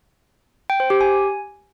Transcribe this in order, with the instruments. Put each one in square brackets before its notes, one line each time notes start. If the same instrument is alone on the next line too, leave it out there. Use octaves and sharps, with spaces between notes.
[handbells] G5
C5
G4
G#5